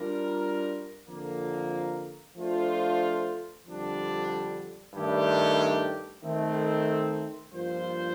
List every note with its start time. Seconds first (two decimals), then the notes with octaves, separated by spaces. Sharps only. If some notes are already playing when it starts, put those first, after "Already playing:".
Already playing: G3 D4 F4 A#4
1.07 F2 D3 F3 A#3
2.36 F3 A3 D4 F4 C5
3.65 F2 D3 G3 D4
4.95 G2 D#3 A3 D4 G4
6.22 D#3 A3 C4
7.52 G2 F3 A#3 F4 C5